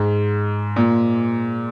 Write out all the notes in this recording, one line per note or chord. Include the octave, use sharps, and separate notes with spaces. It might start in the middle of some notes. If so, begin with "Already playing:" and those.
Already playing: G#2
A#2